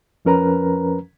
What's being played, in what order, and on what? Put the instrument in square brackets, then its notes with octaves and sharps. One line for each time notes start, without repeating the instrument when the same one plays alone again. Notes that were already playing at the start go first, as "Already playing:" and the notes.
[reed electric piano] F2 F3 C#4 A#4 B4 A#5